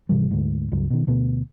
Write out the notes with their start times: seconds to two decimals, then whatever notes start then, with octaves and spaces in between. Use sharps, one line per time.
0.09 G#1 C3 E3 G3
0.31 D2 G#2
0.72 C#2 G2 F#3
0.90 B2 D#3
1.07 D2 B2 B3